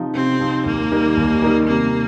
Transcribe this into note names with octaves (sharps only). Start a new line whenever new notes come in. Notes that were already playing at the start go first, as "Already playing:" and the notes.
Already playing: C3 F3 D#4
C3 C4
F3 D#4
D#2 A#3
D#3 G3 D#4 A#4
D#2
D#3 G3 D#4 A#4
C3 A#3